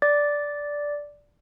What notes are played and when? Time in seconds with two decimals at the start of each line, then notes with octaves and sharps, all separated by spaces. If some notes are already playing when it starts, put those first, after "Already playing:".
0.02 D5 D6 A6